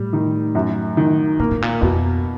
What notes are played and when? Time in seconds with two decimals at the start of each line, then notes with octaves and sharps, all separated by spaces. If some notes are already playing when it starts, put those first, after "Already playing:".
Already playing: A2 G3
0.13 D#3
0.55 F#2
0.97 D#3
1.40 A#2 A#3
1.51 A2
1.62 A#2
1.81 F2 B2